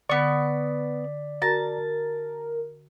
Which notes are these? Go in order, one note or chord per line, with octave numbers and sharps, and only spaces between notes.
D3 B3 D5 C#6 B6
F#4 A#4 A5 A#5 A#6